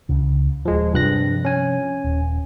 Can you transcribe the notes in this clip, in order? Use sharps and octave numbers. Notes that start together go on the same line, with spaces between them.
C#2 C#3
D#1 F3 G#3
G2 C3 F3 F#6 A#6
C#4 G#5
D#1